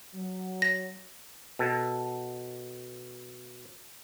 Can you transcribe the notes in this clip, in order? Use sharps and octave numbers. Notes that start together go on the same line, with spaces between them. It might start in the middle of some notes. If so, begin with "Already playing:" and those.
F#3
A#6
B2 A4